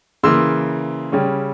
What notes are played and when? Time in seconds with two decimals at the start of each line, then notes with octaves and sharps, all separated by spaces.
0.23 C#3 E3 A#3 C6 E6
1.12 C#3 G3 C#4